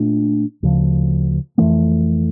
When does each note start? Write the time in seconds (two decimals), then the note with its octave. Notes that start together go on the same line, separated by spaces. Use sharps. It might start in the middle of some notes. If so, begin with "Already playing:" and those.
Already playing: A#2 A3 D4
0.63 D2 C#3 F3
1.58 F2 E3 A3